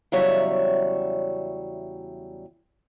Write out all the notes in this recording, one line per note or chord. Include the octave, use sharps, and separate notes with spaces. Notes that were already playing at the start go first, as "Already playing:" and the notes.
E2 C#3 F#3 G3 C#5 E5